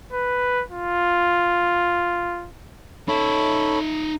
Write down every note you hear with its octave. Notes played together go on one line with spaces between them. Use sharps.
B4
F4
D#4 A4 C#5 E5 B5